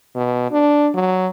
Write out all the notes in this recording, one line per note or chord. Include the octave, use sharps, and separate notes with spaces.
B2
D4
F#3